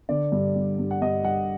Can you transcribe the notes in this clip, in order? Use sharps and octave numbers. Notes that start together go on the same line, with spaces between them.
D3 D5
G2
G3
G2
F#5
G2 D#5
G2 F#5